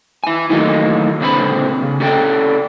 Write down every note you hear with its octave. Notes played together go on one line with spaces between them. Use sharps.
E4 G#5
D#3 E3 F#3 A3 A#3 D#4
C#2 A#2 D3 C4 B4 B5
C#3
C#4 G4 A4 D5 F#5 G5